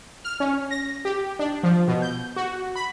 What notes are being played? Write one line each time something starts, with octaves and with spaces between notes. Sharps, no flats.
F6
C#4
A#6
G4
D4
F3
B2
G6
F#4
B5